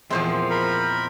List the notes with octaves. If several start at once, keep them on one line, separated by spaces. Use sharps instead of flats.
E2 A#2 F3 G#3 C4 C5
A#4 B5